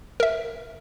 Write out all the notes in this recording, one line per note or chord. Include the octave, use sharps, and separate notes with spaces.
A#4 E5